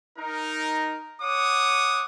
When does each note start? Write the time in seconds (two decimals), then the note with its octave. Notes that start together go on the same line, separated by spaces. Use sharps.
0.18 D#4 A#4
1.21 C#5 F#5 D6 D#6